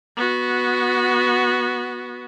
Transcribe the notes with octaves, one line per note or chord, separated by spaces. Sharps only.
B3 F#4